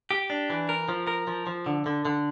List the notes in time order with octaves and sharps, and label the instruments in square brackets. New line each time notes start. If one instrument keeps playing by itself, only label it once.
[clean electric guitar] G4
D4
E3
A#4
F3
A#4
F3
F3
D3
D3
D3